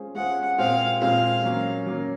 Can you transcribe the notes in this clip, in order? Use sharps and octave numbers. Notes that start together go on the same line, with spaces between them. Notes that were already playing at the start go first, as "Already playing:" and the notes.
Already playing: G#3 C#4 F4 G#4 C5
G#3 C#4 F4 G#4 C5 F#5
A#2 G#3 C4 F4 C5 F5
A#2 G#3 C4 F4 C5 F5
F#3 A#3 C#4
F#3 A#3 C#4